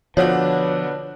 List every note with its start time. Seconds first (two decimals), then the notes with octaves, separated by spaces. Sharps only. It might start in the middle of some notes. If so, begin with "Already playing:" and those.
0.17 B2 D3 F3 D4 F#4 B4 C#5